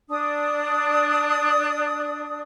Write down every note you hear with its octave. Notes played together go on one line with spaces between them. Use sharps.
D4 D5 D#6